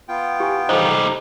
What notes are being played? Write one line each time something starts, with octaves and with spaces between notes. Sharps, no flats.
B3 F4 G5
G4 G#5
G3 D#4 A4 C5